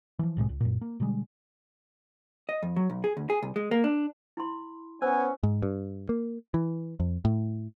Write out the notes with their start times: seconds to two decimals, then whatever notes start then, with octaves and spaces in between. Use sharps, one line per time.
0.19 E3 F3
0.37 C2 A2 C3 G#3
0.49 C#2
0.60 F#2 A#2
0.81 A#3
1.00 B2 D3 G3 G#3
2.49 D#5
2.63 F2
2.76 F#3
2.90 B1
3.04 G#4
3.17 D2
3.30 G#4
3.43 C2
3.56 G#3
3.71 A#3
3.84 D4
4.37 E4 B5 C6
5.02 B3 C#4 C5 G#5 E6
5.43 G#2
5.62 G2
6.09 A#3
6.54 E3
7.00 F2
7.25 A2